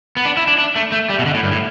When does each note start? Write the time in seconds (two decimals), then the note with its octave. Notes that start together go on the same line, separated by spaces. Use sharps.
0.17 B3
0.25 D4
0.37 E4
0.47 D4
0.58 D4
0.76 A3
0.92 A3
1.10 G3
1.19 B2
1.26 D3
1.34 A2
1.43 G2
1.51 A2